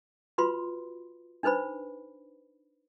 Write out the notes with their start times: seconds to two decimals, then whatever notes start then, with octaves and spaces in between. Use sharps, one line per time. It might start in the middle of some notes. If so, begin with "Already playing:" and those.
0.38 F4 F#4 B4 B5 C6
1.43 D4 D#4 B4 C5 B5